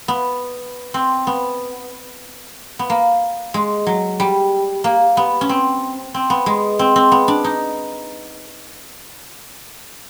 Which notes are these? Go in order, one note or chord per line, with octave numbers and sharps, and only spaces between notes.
B3
C4
B3
B3
A#3
G#3
F#3
G3
A#3
B3
C#4
C4
C4
B3
G#3
C4
C4
B3
D4
D#4